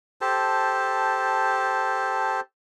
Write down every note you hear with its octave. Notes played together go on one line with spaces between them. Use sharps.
G4 A4 C5 A5